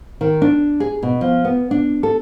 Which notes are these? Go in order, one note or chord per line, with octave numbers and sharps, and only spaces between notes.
D#3
D4
G#4
B2
F3
B3
D4
A4